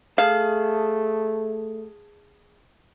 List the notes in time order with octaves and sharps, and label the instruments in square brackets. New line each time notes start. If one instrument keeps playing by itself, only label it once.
[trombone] A3 [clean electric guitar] G#4 A5 [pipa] F5